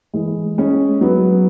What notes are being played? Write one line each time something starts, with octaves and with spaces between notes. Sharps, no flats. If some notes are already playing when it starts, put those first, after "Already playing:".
E3 G#3
G#3 C#4
F#3 B3